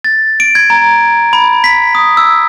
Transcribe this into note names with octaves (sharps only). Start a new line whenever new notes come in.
A6
D7
G#6
A#5
B5
B6
D#6
E6